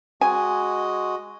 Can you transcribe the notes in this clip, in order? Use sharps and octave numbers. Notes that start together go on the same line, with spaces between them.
G#3 F#4 D#5 G#5